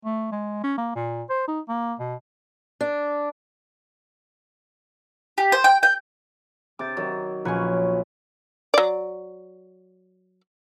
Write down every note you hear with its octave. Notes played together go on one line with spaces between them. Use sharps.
A3
G#3
C#4
A#3
A#2
C5
D#4
A#3
B2
D4
G4
C5
G5
G5
C3 D6 G6 A6
D#3 F#3
A#1 C#4 B4 C#5
F#3 D5